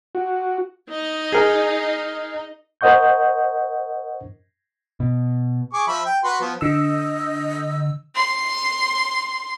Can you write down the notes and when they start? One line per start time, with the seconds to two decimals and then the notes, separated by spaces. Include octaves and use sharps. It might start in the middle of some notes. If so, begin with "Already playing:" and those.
0.15 F#4
0.89 D#4 D#5
1.32 G#4 A#4
2.81 A#4 C5 D#5 F#5 C#6 G6
5.00 B2
5.73 G#4 C#6 D6
5.87 F3 E5 B5
6.06 G5
6.24 F#4 B4 C6
6.41 F3 B3
6.61 D3 D#5 E6
8.15 C6